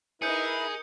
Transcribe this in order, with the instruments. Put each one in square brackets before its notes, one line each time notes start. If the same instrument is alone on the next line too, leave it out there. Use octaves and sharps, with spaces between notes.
[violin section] D#4 A#4 [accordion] E4 B4 [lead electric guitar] G#4 [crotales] D#6 G6 C#7